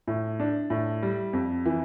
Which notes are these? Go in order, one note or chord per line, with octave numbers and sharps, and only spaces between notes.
A2
D4
A2
G3
F2
E3